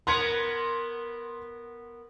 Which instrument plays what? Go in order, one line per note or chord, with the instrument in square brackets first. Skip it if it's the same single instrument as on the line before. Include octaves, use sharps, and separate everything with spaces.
[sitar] B3 A#4 B4 [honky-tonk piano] C6 G#6 C#7